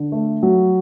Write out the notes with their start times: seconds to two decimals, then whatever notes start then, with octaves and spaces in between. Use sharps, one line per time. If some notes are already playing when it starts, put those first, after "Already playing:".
Already playing: D3
0.12 A3
0.43 F#3